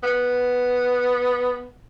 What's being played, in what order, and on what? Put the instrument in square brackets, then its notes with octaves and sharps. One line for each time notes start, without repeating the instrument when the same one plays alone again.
[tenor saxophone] B3